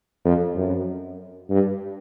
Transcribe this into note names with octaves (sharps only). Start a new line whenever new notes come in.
F2
F#2
G2